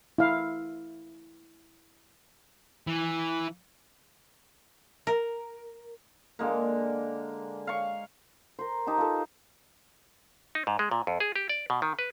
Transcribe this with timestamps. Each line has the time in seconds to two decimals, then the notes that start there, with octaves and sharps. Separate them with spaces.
0.18 E4 F5
2.87 E3
5.07 A#4
6.39 D3 G#3 A#3
7.67 F5 C#6
8.59 A#4 C5
8.87 D#4 G4 A5
8.98 F4 A4
10.55 D#4
10.67 G#2
10.79 G#3
10.91 A#2
11.07 F2
11.20 G#4
11.36 G4
11.49 D5
11.70 B2
11.82 D#3
11.99 B4